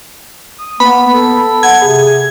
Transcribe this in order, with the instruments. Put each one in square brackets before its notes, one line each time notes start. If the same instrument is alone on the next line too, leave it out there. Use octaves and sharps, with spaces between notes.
[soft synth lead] D#6
[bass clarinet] A#3 [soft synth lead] B3 [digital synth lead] B5
[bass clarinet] A4
[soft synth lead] F#5 [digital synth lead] G#6
[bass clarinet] C3 [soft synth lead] G#4